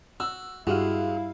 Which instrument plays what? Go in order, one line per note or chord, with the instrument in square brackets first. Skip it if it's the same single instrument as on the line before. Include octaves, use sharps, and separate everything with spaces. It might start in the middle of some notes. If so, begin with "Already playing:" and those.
[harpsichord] F#4 [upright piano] E6
[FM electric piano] G2 G3 F5 [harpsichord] G#3 [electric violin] E4 [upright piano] F#4